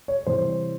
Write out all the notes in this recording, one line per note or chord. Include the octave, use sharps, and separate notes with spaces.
C#5
C3 E3 G3 C5